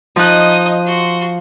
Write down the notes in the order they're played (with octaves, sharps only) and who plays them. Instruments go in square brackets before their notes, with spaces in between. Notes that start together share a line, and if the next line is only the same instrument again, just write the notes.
[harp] F3 F#6 [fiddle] D#4 D#5
[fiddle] F#4 C6